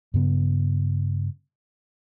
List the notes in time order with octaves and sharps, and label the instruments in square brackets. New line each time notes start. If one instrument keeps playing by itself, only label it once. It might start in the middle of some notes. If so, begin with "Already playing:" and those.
[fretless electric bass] G2 C#3 B3